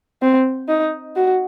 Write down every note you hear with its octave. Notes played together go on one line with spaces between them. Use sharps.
C4
D#4
F#4